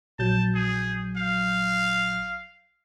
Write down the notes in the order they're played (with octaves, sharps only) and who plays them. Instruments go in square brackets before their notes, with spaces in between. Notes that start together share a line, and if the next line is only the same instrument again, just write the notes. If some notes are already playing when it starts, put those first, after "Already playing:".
[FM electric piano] A#1 F#3 G6 [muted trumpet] A5
[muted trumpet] G#4
F5